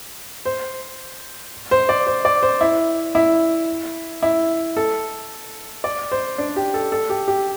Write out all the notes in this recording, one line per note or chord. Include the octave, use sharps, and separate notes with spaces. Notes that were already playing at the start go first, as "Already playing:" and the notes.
C5
C5
D5
C5
D5
C5
E4
E4
E4
A4
D5
C5
D4
G4
A4
A4
G4
G4